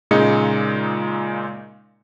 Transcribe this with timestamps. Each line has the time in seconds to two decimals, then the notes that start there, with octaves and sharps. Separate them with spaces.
0.11 A#2 C#3 G#3 D#4 C#7